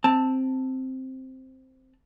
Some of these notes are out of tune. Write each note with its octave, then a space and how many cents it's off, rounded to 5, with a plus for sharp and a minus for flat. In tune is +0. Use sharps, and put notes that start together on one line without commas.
C4 +0 A5 +10